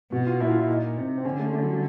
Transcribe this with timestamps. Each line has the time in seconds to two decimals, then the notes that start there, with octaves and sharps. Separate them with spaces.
0.12 B2 F#4
0.27 F4
0.40 A#2 E4 F#4
0.49 F4
0.60 E4
0.68 D#4
0.97 C3
1.18 C4
1.25 D3 C#4
1.39 A3
1.53 A3
1.63 F#3
1.72 G3